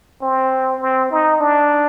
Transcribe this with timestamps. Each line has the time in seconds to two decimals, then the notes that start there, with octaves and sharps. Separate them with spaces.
0.22 C4
0.81 C4
1.11 D#4
1.40 D4